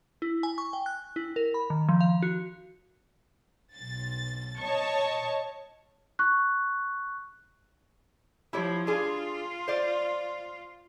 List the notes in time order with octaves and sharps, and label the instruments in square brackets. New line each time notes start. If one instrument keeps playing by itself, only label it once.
[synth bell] E4
G#5
C#6
G5
F#6
E4
A#4
B5
D#3
F3
F5
F#4
[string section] B1 A6
C#5 D#5 A5 C#6
[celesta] C#6 F#6
[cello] F3 [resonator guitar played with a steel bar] E4 G4 C#5
[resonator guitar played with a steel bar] D4 G#4 [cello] F4
[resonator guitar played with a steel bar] C5 D5